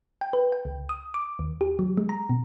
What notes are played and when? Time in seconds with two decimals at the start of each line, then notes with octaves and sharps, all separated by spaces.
0.21 G5
0.33 B4
0.52 G5
0.65 C#2
0.89 D#6
1.14 D6
1.39 D#2
1.61 G4
1.79 F#3
1.97 G#3
2.09 A#5
2.29 B2